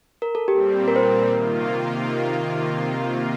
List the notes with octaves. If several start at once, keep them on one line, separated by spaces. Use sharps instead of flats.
A#4
A4
A#2 G3 C4 G4
A#4
C5
A#4
C3 D#3 A#3 F4